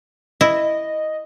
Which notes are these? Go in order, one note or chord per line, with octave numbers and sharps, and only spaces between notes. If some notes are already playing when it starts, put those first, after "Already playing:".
E4 D#5